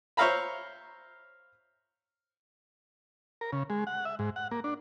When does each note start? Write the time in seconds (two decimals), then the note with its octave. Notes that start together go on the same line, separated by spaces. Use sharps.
0.17 C5 C#5 E5 F5 A#5 B5
3.41 A#4
3.53 C#3
3.70 G#3
3.87 F#5
4.05 E5
4.19 G#2
4.36 F#5
4.51 A#3
4.64 D4